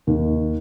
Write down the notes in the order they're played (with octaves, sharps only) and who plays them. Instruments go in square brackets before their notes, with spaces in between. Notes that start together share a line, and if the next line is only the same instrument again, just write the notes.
[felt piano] D#2